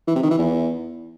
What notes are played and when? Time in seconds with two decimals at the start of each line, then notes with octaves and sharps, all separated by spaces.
0.07 E3
0.15 C3
0.23 D#3
0.31 E3
0.39 E2